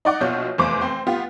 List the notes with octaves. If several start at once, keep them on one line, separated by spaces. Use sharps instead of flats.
D#4 D5 F#5 D6
A#1 B2 F4 F#4 C#5 G6
F1 E2 C5 D6
C4 C6
B3 F4 G4